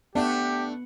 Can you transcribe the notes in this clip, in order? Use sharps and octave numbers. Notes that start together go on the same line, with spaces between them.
A3 B3 D4 G4 F#5